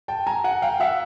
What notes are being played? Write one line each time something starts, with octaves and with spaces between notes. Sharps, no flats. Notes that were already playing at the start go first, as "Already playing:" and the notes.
G5 A5
G#5 A#5
F#5 G#5
F5 G5
E5 F#5